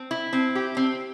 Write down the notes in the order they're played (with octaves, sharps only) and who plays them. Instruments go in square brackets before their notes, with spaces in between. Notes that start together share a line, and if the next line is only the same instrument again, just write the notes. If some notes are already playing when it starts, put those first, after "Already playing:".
Already playing: [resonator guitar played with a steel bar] C4
E4
C4
G4
C4